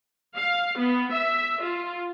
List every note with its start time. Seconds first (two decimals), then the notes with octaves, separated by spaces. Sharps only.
0.36 F5
0.78 B3
1.11 E5
1.62 F4